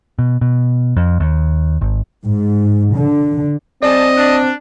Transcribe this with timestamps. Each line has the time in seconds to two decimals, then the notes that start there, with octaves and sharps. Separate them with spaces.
0.19 B2
0.41 B2
0.96 F2
1.20 D#2
1.81 G#1
2.26 G#2
2.94 D3
3.83 G3 C4 G#4 D5 D#5 A5
4.17 D4